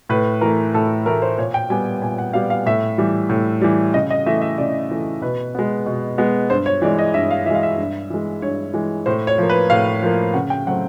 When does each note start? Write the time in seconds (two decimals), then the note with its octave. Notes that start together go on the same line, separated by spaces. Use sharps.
0.09 A2 B4
0.41 E3 A3 A#4
0.74 A2 A4
1.06 E3 A3 A#4
1.22 C5
1.38 A#2 C#5
1.54 G5
1.70 G3 B3 G#5
2.02 A#2 G#5
2.18 F#5
2.33 G3 B3 F5
2.50 F5
2.66 A2 E5
2.98 E3 G3
3.29 A2
3.61 E3 G3
3.94 C#3 D#5
4.10 D#5
4.26 E3 A3 E5
4.42 E5
4.58 C#3 D5
4.91 E3 A3
5.22 B2 B4
5.55 G#3 B3
5.86 B2
6.18 G#3 B3
6.50 G2 C5
6.66 C#5
6.82 E3 G#3 D5
6.99 D#5
7.14 G2 E5
7.31 F5
7.46 E3 E5
7.50 G#3 F5
7.63 E5
7.78 G2
8.10 E3 G#3
8.42 G2 C#5
8.74 E3 G#3
9.06 A2 C5
9.27 C#5
9.38 F3 A#3
9.49 B4
9.70 A2 F5
10.02 F3 A#3
10.34 C#3 F#5
10.50 G5
10.67 F#3 A3 C4 F#5